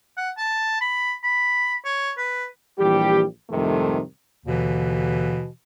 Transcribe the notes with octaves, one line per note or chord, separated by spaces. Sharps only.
F#5
A5
B5
B5
C#5
B4
A#1 E3 G3 G4
C2 F2 G#2 C3 D#3 A3
D#2 B2 D3 E3